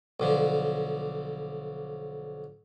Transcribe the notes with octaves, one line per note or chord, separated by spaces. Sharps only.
B1 D3 F3